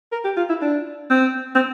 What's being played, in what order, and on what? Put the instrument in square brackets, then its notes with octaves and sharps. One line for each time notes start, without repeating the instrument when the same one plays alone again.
[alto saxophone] A#4
G4
F4
E4
D4
C4
C4